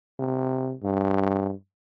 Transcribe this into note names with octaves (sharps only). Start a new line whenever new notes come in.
C3
G2